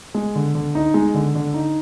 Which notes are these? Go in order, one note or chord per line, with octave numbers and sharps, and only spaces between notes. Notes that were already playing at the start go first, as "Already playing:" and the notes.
G#3
D3
D3
D#4
G#3
D3
D3
D#4